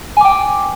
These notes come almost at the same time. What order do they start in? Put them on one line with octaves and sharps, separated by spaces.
G#5 D6 G5